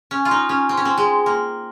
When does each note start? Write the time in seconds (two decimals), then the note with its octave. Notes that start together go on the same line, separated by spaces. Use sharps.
0.11 C#4
0.25 F4
0.31 D#4
0.49 C#4
0.69 C4
0.77 C#4
0.85 C4
0.97 G#3
1.26 A#3